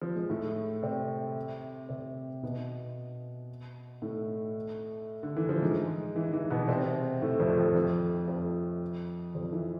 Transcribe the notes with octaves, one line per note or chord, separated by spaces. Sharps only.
F3
G#3
A2 A3
C3 C4
C3 C4
B2 B3
A2 A3
D3
E3
F3
G#2 G#3
E3
E3
B2 B3
C3 C4
A2 A3
F2 F3
F2 F3
F2 F3
F2 F3
F2 F3
E3